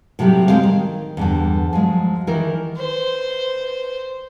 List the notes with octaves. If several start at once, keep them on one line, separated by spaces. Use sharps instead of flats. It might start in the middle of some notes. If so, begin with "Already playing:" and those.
A2 C3 F#3 G3 G4
G#3 C4 C5 F5
D#3
E2 G2 D3
F3 F#3 G#3
D#3 E3 A#4
B4 C5